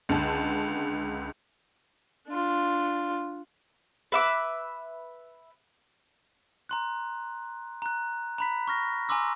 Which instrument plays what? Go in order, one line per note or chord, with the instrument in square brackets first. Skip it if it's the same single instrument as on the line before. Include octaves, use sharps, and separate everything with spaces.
[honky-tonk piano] C#2 D3 A5
[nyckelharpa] D4 F4
[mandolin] B4 E5 D6
[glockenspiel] A#5 C6 F#6
A#5 F#6
A#5 B5 B6
C#6 F6 A#6
G#5 A#5 C6 D6 E6